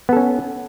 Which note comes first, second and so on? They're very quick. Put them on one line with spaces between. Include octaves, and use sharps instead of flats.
B3 A4 C#4